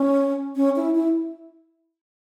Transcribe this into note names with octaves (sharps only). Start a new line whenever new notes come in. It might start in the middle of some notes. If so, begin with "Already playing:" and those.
Already playing: C#4
C#4
E4
E4